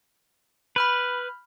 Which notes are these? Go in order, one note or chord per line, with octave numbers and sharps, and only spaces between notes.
B4 B5 F6 G6